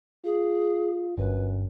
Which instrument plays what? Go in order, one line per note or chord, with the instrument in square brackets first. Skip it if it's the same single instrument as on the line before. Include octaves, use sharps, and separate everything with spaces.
[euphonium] F4 [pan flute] G#4
[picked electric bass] G1 [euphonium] F#2 [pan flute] B4